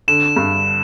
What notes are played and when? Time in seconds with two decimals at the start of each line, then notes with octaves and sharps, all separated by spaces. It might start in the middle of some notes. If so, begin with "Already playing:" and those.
0.08 D3 E7
0.37 G2